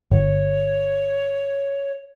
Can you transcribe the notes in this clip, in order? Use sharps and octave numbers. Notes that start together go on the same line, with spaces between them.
G1 C#5